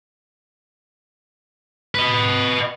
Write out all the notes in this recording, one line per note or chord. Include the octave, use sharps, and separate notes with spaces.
B4 D#5